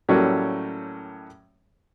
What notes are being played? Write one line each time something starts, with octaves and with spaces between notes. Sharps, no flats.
A2 F#3 G3 A3 A#3 C#4